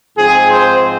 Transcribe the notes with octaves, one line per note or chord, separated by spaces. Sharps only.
G#2 F3 C4 G#4
C5